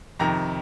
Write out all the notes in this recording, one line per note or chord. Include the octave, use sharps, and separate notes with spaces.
F2 C3 D#3 A#5